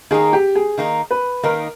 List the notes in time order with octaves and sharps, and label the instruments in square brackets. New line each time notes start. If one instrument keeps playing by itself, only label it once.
[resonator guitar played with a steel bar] D#3 A#3 D#4 [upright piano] G#4
[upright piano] G4
G#4
[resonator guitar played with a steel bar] D#3 A#3 D#4
[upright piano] B4
[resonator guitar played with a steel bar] D#3 A#3 D#4 [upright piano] A#4